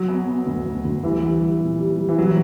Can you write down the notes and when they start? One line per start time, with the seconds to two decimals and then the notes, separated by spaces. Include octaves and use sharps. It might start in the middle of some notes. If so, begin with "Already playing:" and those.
Already playing: F#3
0.08 B3
0.28 B3
0.47 D2
0.66 D2
0.85 D2
1.03 E3 G3
1.23 G3
1.42 G3
1.61 A#2
1.80 G3
1.99 G3
2.09 E3
2.18 F#3 G3